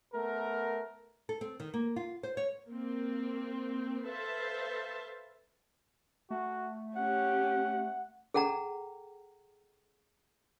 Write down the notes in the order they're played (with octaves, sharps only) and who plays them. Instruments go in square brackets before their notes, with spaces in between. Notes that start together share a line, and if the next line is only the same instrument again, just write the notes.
[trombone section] A3 B3 A#4
[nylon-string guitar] A4
C4
D#3
A#3
F4
C5
C#5
[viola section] A#3 C4
A4 B4 C5 E5 F5 A5
[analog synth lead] A3 [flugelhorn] F#4
[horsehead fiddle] C#4 G4 [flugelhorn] F#5
[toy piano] G#4 A4 F#5 G5 A#5